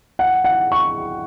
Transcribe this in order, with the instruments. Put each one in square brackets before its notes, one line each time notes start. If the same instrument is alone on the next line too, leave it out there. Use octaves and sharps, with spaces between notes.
[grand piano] F#5
F#5
C#6